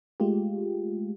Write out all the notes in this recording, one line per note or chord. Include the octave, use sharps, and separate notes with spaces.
G#3 A3 F4 G4